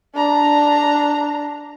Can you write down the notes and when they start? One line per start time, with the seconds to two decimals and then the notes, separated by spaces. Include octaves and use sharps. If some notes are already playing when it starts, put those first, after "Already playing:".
0.14 D4 A#5